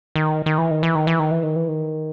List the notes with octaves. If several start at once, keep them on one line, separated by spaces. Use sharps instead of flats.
D#3
D#3
E3
D#3
E3
D#3
E3
D#3
E3
D#3
E3
D#3